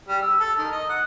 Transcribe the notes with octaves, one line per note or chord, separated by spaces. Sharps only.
G3
E6
A4
D#3
D#5
F#5